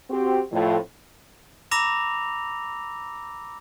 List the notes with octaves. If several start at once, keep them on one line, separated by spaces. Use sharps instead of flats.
C4 F#4 G4
F2 A2 F3
A#5 B5 D6 E6 A#6 F7